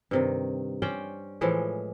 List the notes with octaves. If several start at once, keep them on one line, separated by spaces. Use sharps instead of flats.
G2 C3 D#3
C#4 C5 D5 G5
A2 E3 F3 G#3